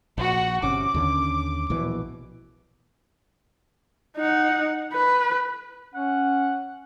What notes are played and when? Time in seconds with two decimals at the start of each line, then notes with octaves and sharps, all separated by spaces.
0.18 A#1 F#4 F#5
0.62 G1 C3 C#4 D6
0.94 D#2 D3 C#4
1.70 A#1 B2 E3
4.17 D#4 F#5
4.93 B4
5.94 C#4 F#5